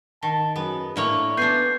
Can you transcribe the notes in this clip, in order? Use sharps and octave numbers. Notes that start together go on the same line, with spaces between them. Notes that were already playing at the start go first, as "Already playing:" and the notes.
D#3 A5
F#2 B3 G#4
A2 A#3 D4 E4 C#5
B3 D4 F4 G#5 G6 C7